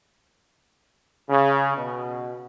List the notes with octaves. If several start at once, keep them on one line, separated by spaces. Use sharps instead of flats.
C#3
B2